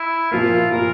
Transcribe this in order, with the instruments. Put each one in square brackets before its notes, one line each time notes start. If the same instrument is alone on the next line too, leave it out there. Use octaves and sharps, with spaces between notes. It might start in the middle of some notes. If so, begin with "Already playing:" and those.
Already playing: [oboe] E4
[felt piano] A#2 F3 A#3 [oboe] F4
[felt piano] A#2 F3 A#3 [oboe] A#4